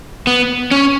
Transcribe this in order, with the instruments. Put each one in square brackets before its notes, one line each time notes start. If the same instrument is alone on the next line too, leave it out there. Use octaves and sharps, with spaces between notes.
[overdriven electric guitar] B3
C#4